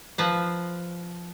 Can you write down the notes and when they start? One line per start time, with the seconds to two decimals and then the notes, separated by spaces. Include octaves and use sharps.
0.18 F3 B4 C5